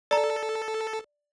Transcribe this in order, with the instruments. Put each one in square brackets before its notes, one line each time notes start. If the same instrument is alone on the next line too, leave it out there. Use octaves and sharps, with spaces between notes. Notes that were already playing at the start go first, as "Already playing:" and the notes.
[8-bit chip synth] A4 [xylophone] D5 A#5